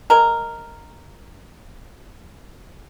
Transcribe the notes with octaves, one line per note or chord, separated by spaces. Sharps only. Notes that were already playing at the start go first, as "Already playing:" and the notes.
G#3 A#4